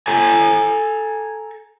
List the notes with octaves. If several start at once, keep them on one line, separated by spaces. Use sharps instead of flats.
A4 G#5 A#5